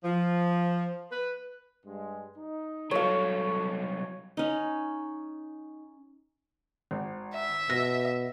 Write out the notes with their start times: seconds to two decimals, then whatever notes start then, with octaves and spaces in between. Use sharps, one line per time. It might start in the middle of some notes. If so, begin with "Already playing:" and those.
0.04 F3
1.12 B4
1.86 G2 G#3
2.38 D#4
2.91 C2 F#3 A4 C#5 F5
4.37 C#4 D#4
6.91 G#1
7.34 E5
7.70 B2 E6 A#6